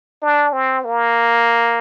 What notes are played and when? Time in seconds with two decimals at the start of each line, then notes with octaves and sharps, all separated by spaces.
0.22 D4
0.53 C4
0.85 A#3